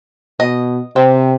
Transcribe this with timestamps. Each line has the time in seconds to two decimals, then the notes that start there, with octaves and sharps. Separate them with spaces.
0.40 B2 D#5
0.96 C3 C4